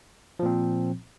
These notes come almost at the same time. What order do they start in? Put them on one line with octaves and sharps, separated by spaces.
F3 A#2 C4